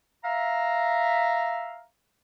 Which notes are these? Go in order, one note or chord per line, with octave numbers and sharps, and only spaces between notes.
E5 F5 A#5